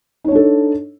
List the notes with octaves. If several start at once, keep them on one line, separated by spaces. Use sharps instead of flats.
D4 D#4 A4 C#5